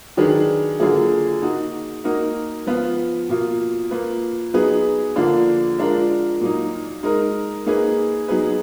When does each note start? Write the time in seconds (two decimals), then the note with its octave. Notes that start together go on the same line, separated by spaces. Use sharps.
0.17 D#3 F#3 D4 G#4 B4
0.80 D3 F#3 A#3 F4 G#4
1.42 A#3 D#4 F#4
2.04 A#3 D#4 F#4 A#4
2.67 F3 B3 F4 B4
3.29 B2 A#3 F4
3.91 A#3 F4 B4
4.54 F#3 B3 D#4 G#4 B4
5.16 D3 F3 A#3 D4 F4
5.79 G#3 D4 F4 A#4
6.41 A#2 F#3 A#3 D#4
7.03 G#3 D#4 A#4
7.66 A#3 D#4 G#4 B4
8.28 F#3 B3 D#4 G#4 B4